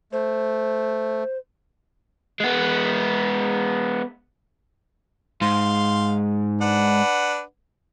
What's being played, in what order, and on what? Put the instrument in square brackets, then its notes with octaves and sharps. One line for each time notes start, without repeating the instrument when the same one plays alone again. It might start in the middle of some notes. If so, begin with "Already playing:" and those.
[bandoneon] A3 [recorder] C5
[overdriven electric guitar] G#3 B3
[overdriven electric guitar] G#2 [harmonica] F5 C6
[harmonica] D4 B4 F#5